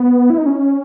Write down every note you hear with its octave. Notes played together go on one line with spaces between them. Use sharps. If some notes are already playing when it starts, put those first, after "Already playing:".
Already playing: B3
E4
D#4
C#4